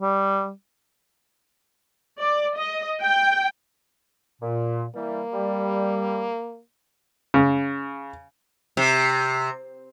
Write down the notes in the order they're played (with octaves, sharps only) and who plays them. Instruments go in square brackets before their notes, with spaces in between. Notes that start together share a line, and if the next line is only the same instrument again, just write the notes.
[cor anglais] G3
[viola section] D5
D#5
G5
[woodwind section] A#2
[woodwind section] E3 G3 [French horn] A#3
[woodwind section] G3
[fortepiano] C#3
[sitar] C3